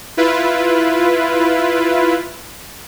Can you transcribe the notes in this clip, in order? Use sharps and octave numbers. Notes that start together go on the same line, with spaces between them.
E4 F4 B4